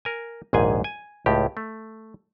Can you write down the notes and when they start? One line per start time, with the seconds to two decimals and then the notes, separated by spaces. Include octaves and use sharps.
0.05 A#4 G#5
0.53 A#1 D#2 G#2 G#4 G#5
0.84 G#5
1.26 C#2 A2 G4
1.57 A3